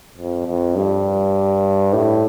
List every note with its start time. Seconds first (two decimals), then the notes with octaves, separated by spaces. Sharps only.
0.18 F2
0.47 F2
0.76 G2
1.93 A2